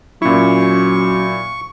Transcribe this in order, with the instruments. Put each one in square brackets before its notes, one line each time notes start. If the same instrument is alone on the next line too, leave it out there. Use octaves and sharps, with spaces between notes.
[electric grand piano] A#2 E4 [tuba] F#3 [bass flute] C#4 [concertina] C#6